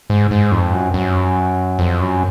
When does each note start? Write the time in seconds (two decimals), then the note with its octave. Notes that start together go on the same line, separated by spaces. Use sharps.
0.10 G#2
0.31 G#2
0.52 F2
0.73 F#2
0.94 F#2
1.79 F2
2.01 F#2